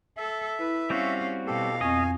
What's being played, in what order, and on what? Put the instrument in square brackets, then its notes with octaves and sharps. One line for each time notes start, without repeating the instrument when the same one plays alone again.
[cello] A4 [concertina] E5
[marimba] E4 [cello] B4
[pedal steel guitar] G3 C4 F#4 [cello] C#4 F5
[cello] B2 F5 [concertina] G4 A4
[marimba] F2 C4 C#6 [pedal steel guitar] D#5 [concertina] G#5